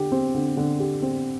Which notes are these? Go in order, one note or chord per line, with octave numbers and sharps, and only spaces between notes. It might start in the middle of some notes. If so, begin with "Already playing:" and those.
Already playing: D3 G4
C4
D3
D3
G4
C4